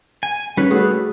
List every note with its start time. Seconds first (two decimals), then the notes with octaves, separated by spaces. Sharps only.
0.23 G#5
0.57 G3 C#4 B4 C#5 B6
0.71 A3 F#4 G#4